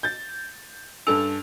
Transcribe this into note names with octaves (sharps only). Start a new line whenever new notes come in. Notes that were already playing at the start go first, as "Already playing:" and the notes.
G6 A6
G2 C#4 A4 G#5 E6 F7